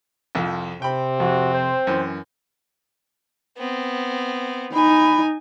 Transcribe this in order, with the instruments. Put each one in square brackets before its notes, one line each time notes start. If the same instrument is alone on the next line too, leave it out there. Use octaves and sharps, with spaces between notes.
[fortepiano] C2 F2 F3
[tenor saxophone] C3 [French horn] C4 [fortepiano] G5 B5
[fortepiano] F2 [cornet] F#4
[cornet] C5
[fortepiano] F#2 E3
[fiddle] B3 C4
[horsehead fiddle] D#4 [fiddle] G#5 [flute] B5